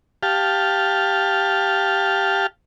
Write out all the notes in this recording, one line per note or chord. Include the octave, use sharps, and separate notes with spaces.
G4 F5 A5